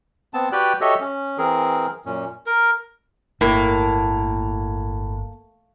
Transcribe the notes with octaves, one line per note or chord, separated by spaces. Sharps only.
B3 C4 A5
F#4 G4 B4 D5 G5 F#6
F#4 G4 A4 C#5 D#5 E5
C#4
E3 C4 G#4 A#4
F#2 A#2 C#4
A#4
G1 A2 A#3